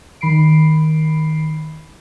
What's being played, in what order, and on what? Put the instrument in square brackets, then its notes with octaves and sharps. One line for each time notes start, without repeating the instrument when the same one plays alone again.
[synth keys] D#3 B5 C7 D7